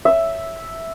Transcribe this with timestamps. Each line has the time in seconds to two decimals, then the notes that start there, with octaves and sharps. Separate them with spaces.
0.05 E5